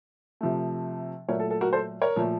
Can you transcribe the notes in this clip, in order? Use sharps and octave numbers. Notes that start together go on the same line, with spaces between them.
C3 F3 A3
A#2 F#3 A3 A#4 C#5
A4
A4
F#4 A#4
A4 C5
A#4 C#5
A#2 F3 A3